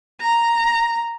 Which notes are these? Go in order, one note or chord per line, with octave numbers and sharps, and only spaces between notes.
A#5